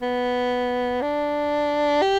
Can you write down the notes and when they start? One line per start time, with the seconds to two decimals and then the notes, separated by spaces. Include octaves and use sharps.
0.02 B3
1.02 D4
2.02 G4